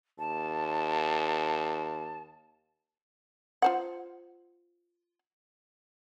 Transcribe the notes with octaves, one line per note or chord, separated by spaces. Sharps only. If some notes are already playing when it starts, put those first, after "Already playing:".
D#2 A5
F4 C5 F#5